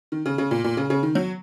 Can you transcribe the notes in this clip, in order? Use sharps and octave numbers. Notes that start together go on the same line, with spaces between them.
D#3
C#3
C#3
A#2
A#2
C#3
C#3
D#3
F#3